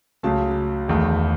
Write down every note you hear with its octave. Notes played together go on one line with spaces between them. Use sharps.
C#2 C#3 F#3 A3 A5
E1 E2 D#3 A3